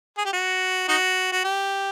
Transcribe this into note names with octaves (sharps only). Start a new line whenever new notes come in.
G#4
G4
F#4
D#4 F#4
F#4
G4